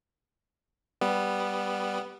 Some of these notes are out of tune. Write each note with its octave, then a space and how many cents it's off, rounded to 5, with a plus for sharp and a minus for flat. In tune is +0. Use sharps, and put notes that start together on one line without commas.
G3 +0 B3 +0